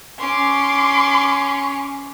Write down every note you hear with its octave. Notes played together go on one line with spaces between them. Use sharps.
C#4 C6 D6